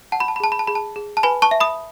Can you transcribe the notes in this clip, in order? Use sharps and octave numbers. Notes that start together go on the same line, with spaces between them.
F#5 A5
B5
A5
B5
G#4 A5
B5
A5
G#4 B5
A5
G#4
A5
B4 G#5 B5
A5 C#6
E5
B5 D#6